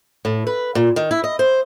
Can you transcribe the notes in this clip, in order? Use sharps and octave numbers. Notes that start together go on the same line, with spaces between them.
A2
B4
A#2
D#3
E4
D#5
C5